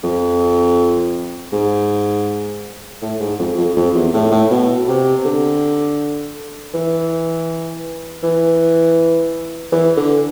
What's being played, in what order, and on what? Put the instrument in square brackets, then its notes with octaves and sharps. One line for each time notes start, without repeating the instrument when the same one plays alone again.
[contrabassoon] F2
G#2
A2
G#2
F2
F2
F2
E2
A2
A2
B2
C3
D3
E3
E3
E3
D3